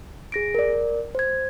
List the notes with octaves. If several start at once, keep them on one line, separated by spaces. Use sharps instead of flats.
G#4 A#6 D7
A#4 D5
C5 G#6